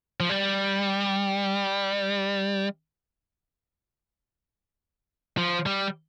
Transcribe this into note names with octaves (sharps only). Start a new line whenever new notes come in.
F3
G3
F3
G3